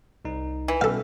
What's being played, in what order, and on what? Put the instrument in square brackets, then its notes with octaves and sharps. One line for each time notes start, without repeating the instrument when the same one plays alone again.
[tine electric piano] C2 D#4
[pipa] E3
[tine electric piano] B2 G3 C#4 [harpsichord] A4 F5